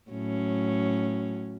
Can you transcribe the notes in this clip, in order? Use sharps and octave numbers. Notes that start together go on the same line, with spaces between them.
A2 F#3 C#4